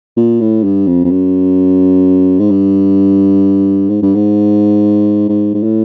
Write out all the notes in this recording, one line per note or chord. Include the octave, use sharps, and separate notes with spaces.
A#2
A2
G2
F2
F2
F#2
G#2
G2
G#2
G2
G#2
G#2
G#2
A2